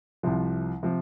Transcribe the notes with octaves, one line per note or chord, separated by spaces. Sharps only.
C2 C3 F3
C3 F3